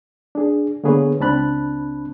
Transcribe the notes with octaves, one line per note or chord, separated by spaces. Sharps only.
D4 G#4
D3 A#3 B3 G#4 B4 C#5
C#2 C4 D4 A5 B5 F#6